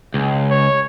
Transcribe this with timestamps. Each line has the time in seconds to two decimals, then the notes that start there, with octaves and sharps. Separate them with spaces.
0.14 C#2
0.51 C#5